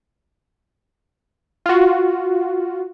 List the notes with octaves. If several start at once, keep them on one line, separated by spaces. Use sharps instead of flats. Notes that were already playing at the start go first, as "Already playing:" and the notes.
F4 F#4